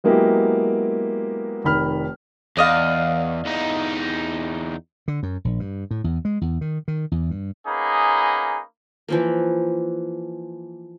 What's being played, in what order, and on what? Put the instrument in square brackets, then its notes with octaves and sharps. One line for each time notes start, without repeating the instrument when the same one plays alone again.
[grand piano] F#3 G#3 A#3 B3 E4 G4
F1 D#3 B5 F6
[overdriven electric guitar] E2 [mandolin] D5 D#5 F5
[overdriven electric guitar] E2 D#4
[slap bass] D3
F#2
A#1
G2
A2
E2
G#3
E2
D#3
D#3
E2
G2
[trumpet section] A#3 B3 C#4 D#4 G#4 B5
[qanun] E3 F3 A#3